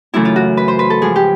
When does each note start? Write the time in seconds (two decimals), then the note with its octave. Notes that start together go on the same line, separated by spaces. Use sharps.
0.14 F#2 C#3 E3 A3 E4
0.25 F4
0.36 F#4
0.57 B4
0.68 C5
0.79 B4
0.90 A4
1.02 G#2 F3 G#3 G#4
1.16 G4